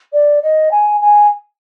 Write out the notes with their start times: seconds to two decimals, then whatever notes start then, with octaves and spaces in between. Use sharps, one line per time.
0.13 D5
0.42 D#5
0.71 G#5
1.01 G#5